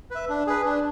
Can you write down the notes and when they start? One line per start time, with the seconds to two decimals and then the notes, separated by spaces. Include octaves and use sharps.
0.11 B4 E5
0.29 D4
0.47 G#4 B4
0.65 D4